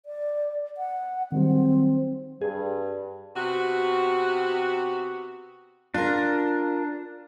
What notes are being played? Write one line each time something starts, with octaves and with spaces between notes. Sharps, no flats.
D5
F#5
D#3 F#3 G3 C4
G2 G#4
C3 B3 F#4
D4 F4 A#4